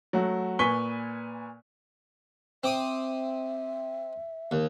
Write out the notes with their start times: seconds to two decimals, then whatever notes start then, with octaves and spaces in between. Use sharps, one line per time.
0.13 F#3 A3 F#4
0.59 A#2 B4 G#5 C#6 B6 G7
2.63 C4 E5 D6 D#6
4.51 D#2